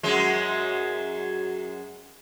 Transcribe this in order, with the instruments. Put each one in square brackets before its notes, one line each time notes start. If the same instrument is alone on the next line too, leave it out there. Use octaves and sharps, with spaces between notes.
[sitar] F#2 F#3 G#3